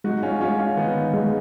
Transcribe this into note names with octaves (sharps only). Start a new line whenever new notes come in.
G#3 D#4 F#4
C#4 F4
G#3 C#4 F4
C#4 F4
D#3 B3 D#4
G#3